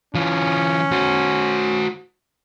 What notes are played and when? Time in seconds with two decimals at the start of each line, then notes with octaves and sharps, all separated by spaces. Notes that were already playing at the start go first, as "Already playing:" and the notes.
0.15 E3 C#4 F4
0.92 F#4 C5